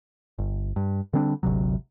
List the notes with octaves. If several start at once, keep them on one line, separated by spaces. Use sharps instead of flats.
G1
G2
D3 G3 C4 D4
G#1 D2 C3 F#3